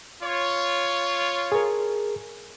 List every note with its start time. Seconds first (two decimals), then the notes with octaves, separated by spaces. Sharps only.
0.23 F4 C#5
1.52 G#4 A#4